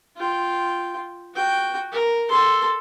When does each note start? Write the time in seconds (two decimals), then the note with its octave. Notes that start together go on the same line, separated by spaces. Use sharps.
0.17 F4 G5
1.35 F#4 G5
1.92 A#4
2.29 A4 C6